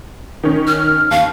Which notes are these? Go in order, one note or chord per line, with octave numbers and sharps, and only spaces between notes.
D#3 C#4
F6
D#2 F5